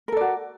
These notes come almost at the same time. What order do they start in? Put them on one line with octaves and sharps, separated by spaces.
A#4 A4 D5 F#4